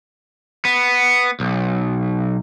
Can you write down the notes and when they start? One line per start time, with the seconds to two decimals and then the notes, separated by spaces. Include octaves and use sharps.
0.65 B3
1.40 B1